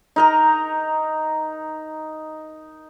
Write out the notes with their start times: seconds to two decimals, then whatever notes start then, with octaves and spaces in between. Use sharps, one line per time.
0.16 D#4 A#4 A#5